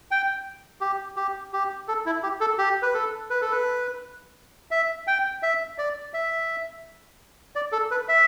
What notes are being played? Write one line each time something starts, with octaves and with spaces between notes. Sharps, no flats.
G5
G4
G4
G4
A4
E4
G4
A4
G4
B4
A4
B4
A4
B4
E5
G5
E5
D5
E5
D5
A4
B4
E5